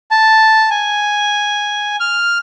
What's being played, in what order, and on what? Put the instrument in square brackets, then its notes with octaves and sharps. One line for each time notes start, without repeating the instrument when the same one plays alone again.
[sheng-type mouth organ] A5
G#5
F6